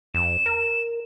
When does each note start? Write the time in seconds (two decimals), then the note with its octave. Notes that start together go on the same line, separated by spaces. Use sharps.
0.14 F2 E7
0.46 A#4